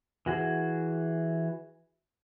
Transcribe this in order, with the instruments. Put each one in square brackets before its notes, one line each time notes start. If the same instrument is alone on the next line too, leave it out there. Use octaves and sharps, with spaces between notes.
[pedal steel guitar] E3 F#4 G#4